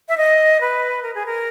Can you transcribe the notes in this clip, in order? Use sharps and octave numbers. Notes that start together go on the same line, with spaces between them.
E5
D#5
B4
A#4
G#4
A#4